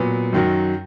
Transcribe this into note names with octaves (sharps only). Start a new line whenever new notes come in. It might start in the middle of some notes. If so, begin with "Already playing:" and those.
Already playing: A#2 F#3 B3
F#2 D#3 F#3